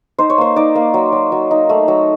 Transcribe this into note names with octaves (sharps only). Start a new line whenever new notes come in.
D#4 C5
C#5
A#3 C5
D#4 D5
A#3
F#3
F#3
F#3
D#4
A3
F#3